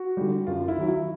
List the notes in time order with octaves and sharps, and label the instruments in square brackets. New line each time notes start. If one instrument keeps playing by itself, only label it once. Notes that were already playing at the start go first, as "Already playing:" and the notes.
Already playing: [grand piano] F#4
D3 G3
F#2 F4
E4
D#3 F#3
E4